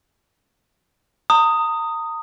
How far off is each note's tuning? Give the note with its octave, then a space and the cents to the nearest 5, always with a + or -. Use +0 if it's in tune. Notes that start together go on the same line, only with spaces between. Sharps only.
A#5 -35 D#6 +0